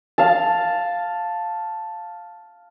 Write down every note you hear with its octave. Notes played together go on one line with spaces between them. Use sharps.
F5 A5